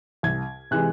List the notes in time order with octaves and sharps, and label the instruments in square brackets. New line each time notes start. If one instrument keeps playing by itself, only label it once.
[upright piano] C2 G#6
C3 E3 G#3 F#6